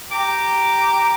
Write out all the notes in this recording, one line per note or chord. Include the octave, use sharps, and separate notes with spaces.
G4 A#5 D6